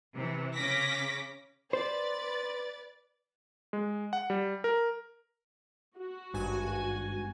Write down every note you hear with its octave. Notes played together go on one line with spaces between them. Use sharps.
C3 E3
C#3 C#4 D6 A#6 B6
B4 C5 D5 A6
G#3
F#5
G3
A#4
F#4
G#1 G2 G#5